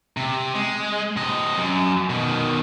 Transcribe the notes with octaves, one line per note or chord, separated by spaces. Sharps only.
C3
G#3
C3 D#5
F#2
B2 D#3